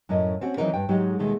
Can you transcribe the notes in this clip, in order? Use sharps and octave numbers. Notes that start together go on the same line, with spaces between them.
F#2 A2 C#4 D#5
C4 C#4 F#4
D#3 E3 F#3 C4 D#4 A#4
G2 G5
G#2 F#3 G#3 D#4 G4
D#2 B2 D#3 G#3 A3